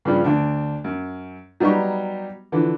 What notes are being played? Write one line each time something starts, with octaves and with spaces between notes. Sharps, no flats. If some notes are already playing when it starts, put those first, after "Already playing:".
G2 C#3 F3 G3
D2 D4
F#2
F#3 G3 B3 D#4 G4 C#6
D3 E3 F3